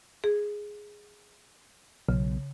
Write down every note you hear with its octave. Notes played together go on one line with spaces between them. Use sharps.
G#4
B1 C#3